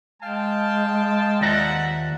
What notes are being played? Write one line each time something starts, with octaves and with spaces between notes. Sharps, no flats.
G#3 F5 G5 A5
D#2 F3 D5 E5 F#5 A#5